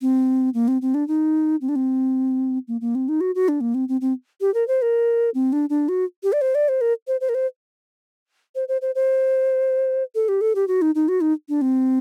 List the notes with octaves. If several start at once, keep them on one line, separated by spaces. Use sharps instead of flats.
C4
A#3
C4
C4
D4
D#4
C4
D4
C4
A#3
A#3
C4
D#4
F#4
F#4
D4
A#3
C4
C4
C4
G4
A#4
C5
A#4
C4
D4
D4
F#4
G4
D5
C5
D5
C5
A#4
C5
C5
A#4
C5
C5
C5
C5
C5
A4
G4
A4
G4
F#4
D#4
D#4
F#4
D#4
D4
C4